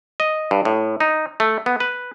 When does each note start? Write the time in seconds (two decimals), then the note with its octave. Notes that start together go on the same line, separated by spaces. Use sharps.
0.20 D#5
0.51 G2
0.65 A2
1.00 D#4
1.40 A3
1.66 B3
1.80 B4